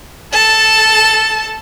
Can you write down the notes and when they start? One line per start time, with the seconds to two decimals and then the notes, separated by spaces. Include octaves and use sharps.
0.33 A4 A5